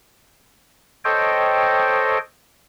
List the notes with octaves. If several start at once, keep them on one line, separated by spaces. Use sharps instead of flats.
A4 C5 C#5 D#5 G5